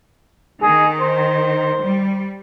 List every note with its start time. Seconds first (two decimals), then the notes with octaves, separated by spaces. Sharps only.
0.62 D#3 G#4
1.01 C5
1.84 G3